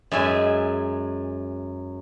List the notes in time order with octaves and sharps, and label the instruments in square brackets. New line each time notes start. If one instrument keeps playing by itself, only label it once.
[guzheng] F#2 G#3 E5 G#5